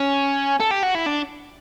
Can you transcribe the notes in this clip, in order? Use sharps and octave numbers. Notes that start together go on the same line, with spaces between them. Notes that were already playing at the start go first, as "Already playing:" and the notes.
Already playing: C#4
A4
G4
F#4
E4
D4